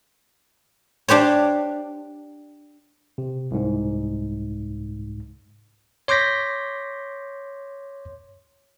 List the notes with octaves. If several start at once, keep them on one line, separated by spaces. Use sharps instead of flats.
D4 G4 C5 C#5
C3
C2 G#2
C#5 C6 D6 G6 A#6 B6